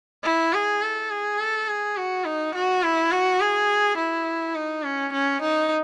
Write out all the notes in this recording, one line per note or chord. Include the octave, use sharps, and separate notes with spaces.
E4
G#4
A4
G#4
A4
G#4
F#4
D#4
F#4
E4
F#4
G#4
E4
D#4
C#4
C#4
D#4